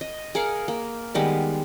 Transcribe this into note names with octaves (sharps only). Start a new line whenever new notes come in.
D#5
G#4 A#4 F5 F#5
A#3
D#3 G3 G#3 B3